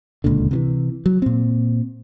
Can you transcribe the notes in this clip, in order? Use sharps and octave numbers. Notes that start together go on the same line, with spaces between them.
D1 C#2 A#2 D3
C3 D#3 E3
F#3
A#2 C4